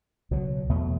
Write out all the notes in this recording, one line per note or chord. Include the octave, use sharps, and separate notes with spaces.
C#2 B2 F#3
E2 B2 A3